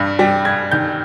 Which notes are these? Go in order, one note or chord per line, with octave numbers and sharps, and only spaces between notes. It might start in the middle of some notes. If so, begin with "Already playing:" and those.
Already playing: G2 G3
G3
G2 G#6
D#3 G6